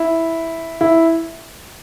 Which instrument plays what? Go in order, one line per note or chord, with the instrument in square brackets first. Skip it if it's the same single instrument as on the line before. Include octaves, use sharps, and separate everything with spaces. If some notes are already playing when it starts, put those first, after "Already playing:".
Already playing: [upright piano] E4
E4